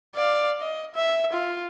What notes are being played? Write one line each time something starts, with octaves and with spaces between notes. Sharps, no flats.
D5 F5
D#5
E5
F4